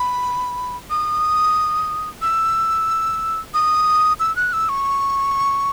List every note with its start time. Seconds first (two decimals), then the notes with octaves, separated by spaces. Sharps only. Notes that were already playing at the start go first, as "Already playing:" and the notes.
Already playing: B5
0.90 D#6
2.22 E6
3.54 D#6
4.20 E6
4.36 F#6
4.53 E6
4.69 C#6